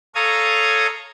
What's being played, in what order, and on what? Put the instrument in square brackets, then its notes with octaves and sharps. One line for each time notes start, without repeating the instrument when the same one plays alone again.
[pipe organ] A4 C#5 F5 A#5 D#6 G#6